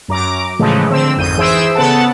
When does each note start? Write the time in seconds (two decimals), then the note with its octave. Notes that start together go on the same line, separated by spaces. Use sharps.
0.08 F#2 A#5 D6
0.59 A2 C#3 E3 F3 G#3 A3
0.90 D3 C4 E6
1.16 G#1 F2 G6 D#7
1.37 E3 G#4 C5 E5 E6 D7
1.75 C#3 B3 A4 F#5 A5